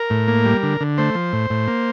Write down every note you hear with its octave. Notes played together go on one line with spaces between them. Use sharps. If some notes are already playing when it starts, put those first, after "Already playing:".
Already playing: A#4
A2
A#3
G3
D3
D3
A3 C5
F3
A2
A2
A#3